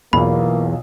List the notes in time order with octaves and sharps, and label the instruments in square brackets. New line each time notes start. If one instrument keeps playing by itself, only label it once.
[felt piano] B1 B2 F4 [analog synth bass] E2 [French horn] A#3 [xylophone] B5